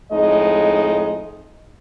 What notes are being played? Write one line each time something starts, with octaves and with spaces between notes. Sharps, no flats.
F2 A2 G#3 D#4 D#5